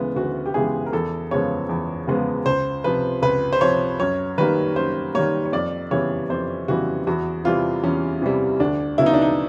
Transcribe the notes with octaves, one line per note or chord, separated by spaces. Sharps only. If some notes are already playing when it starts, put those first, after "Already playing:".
Already playing: D2 C#3 E3 G#3 B3
D2 F#4
G4
C#3 E3 G#3 B3 G#4
A#4
E2 A4
C#3 F3 G#3 B3 C#5
E2
C#3 F3 G#3 B3
C#2 C5
C3 F3 B4
C#2 B4
C5
C3 F3 C#5
F#2 C#5
D#3 G3 A#3 B4
F#2 C5
D#3 G3 A#3 C#5
C#5
F2 D5
C#3 E3 G3 B3 C#5
F2 C5
C#3 E3 G3 B3 F#4
E2 F#4
C3 E3 G3 F4
E2 C#4
C3 E3 G3
D2 D4
C#3 F#3 B3 E4
D#4
D4
D#4